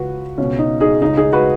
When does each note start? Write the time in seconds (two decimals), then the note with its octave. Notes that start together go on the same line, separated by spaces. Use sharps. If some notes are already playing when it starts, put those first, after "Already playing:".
Already playing: C#2 C#3 F#4 B4
0.38 C#2 B2 C#4
0.59 D#4
0.80 D#4 G#4
1.02 C#2 C#3 D#4
1.17 D#4 G#4
1.33 F#4 B4